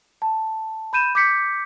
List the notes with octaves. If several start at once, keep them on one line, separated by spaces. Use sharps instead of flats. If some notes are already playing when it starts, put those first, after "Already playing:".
A5
B5 G6 D#7 E7
D6 G6 B6 C#7